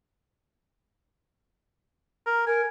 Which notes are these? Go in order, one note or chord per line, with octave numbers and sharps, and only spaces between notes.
A#4
A#4 G#5